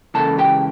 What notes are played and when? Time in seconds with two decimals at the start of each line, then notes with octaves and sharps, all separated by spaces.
0.14 C#2 C#3 E3 A#3 A4 A5
0.38 G4 G5